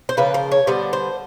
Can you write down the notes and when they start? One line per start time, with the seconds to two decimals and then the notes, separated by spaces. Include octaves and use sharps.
0.09 C5
0.17 C#3 F3 A#3 B4
0.34 C5
0.51 C#5
0.67 D3 G3 B3 C5
0.93 C5